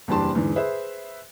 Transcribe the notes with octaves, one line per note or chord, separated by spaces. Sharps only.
F#1 E2 G3 D4 A5 C6
E2 G#2 D3
G#4 B4 C5 E5